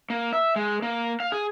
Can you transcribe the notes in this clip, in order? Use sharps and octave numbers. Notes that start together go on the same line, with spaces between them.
A#3
E5
G#3
A#3
F5
G#4